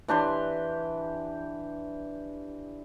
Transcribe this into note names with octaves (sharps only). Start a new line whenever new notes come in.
E3 D4 G4 C6